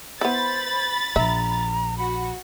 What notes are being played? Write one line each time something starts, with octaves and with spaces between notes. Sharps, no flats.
B3 E4 C5 B5 A6
A#1 E5 A#5
F#4 B5